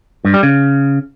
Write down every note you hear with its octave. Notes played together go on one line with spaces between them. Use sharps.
G2
G3
C#3